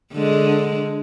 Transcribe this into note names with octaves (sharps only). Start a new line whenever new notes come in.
D3 G#3